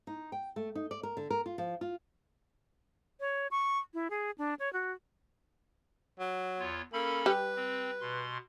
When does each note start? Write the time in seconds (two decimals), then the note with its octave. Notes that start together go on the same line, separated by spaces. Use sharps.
0.07 D#4
0.32 G5
0.56 A3
0.75 D#4
0.91 D5
1.03 A#4
1.17 D3
1.30 A#4
1.46 F4
1.58 F3
1.81 F4
3.20 C#5
3.51 C#6
3.94 E4
4.10 G#4
4.38 D4
4.59 C#5
4.73 F#4
6.19 F#3
6.59 E2 F4 C#5
6.93 A#3 C#4 A4 B5
7.26 G3 G4 B4
7.56 C4
8.01 B2 C6